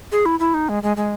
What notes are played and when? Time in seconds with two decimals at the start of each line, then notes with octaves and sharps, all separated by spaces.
0.12 G#4
0.26 E4
0.40 E4
0.54 D#4
0.69 G#3
0.83 G#3
0.97 G#3